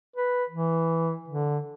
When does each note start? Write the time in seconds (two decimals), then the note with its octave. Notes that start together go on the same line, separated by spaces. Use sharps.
0.16 B4
0.50 E3
1.28 D3